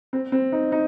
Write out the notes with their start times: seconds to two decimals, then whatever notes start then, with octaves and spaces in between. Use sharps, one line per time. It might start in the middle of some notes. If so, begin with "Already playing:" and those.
0.13 C4
0.32 C4
0.52 D#4
0.72 D#4